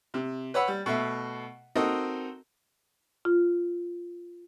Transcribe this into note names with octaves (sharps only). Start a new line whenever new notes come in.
C3
B4 C#5 F#5 B5 E6
G3
B2 A3 E5
C4 D#4 F#4 A4 A#4 D#5
F4